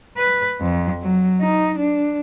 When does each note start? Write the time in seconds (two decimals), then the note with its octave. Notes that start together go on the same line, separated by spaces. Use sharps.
0.17 B4
0.61 F2
1.02 F#3
1.41 D#4
1.79 D4